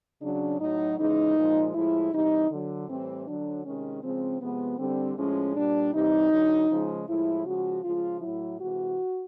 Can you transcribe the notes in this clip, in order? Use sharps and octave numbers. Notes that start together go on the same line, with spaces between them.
C#3 F#3 D4
A2 F#3 D#4
C#3 E3 G#3 D#4
A#2 F3 G#3
A2 F3 G#3 E4
C3 E3 G3 D#4
D3 F#3
A2 E3 G3 C4
D3 F#3 D4
C3 D#3 G#3 C#4
C#3 F3 G#3 C4
C3 F3 G#3 B3
D3 G3 C4
A2 F3 G#3 C#4
A#2 G3 D4
C3 E3 G3 D#4
D3 F#3
C#3 F3 G#3
A2 F3 G#3 E4
C#3 F3 G#3 F#4
C#3 F3 G#3 F4
A2 F#3 E4
C3 E3 G#3 F#4